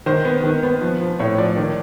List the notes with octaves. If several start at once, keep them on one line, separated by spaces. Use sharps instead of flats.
D#3 C5
B3
D#3
B3
F3
F3
A2 C#5
F3 D5
D#3